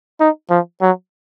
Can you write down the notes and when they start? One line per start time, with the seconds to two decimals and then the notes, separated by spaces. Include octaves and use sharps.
0.20 D#4
0.50 F3
0.81 F#3